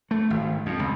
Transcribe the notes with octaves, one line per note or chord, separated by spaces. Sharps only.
A3
G#1
F2
C#2